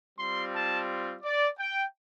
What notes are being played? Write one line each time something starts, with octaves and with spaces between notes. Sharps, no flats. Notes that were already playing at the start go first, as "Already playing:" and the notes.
G3 C4 F4 C6
A5
D5
G5